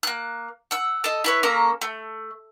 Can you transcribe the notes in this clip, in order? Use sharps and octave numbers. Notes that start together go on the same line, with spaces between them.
A#3 F#6
F#5 E6
A4 D#5
E4 B4 C#5
A#3 C#4 A4 A#5
A3